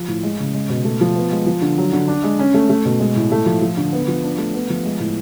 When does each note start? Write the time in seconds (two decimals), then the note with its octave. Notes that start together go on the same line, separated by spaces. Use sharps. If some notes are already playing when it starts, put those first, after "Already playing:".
Already playing: F3
0.08 A2
0.23 G#3
0.39 C#3
0.54 G#3
0.69 B2
0.85 A3
1.01 F3
1.16 B3
1.31 G#3
1.46 F3
1.61 D3
1.78 F#3
1.93 D3
2.08 D4
2.24 G#3
2.39 C#4
2.54 A3
2.70 A3
2.85 B2
3.00 G#3
3.16 A2
3.32 A3
3.46 F3
3.62 F3
3.77 D3
3.93 B3
4.08 F3
4.24 D4
4.38 A3
4.54 B3
4.70 F3
4.85 G#3
5.00 A2